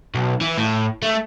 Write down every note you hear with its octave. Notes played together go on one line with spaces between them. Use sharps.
B1
E3
A2
A3